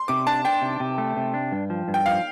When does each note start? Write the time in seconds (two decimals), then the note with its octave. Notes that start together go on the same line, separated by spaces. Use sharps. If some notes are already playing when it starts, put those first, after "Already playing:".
Already playing: C6
0.08 C3 D6
0.27 D4 A5
0.45 D4 G5
0.62 C3
0.80 C3
0.98 A3
1.17 C3
1.34 D4
1.52 G2
1.70 F3
1.88 G2
1.94 G5
2.06 F3 F5